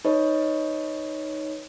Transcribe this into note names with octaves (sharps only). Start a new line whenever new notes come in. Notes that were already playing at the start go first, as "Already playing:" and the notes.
D#4 B4 C#5 D#5